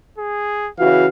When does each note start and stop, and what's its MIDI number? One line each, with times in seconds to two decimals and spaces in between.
0.18 0.70 68
0.79 1.06 49
0.79 1.06 52
0.79 1.06 66
0.79 1.08 77